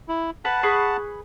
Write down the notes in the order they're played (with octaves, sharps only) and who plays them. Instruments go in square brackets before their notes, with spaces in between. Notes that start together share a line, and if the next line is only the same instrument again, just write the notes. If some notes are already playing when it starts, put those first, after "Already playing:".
[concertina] E4
[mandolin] B4 [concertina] F#5 A5
[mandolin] G#4 B4 C#6